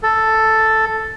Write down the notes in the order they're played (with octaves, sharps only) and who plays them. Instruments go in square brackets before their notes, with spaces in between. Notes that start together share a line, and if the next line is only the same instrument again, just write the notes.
[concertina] A4